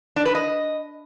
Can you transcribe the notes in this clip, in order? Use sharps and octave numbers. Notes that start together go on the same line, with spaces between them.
D4
B4
D#5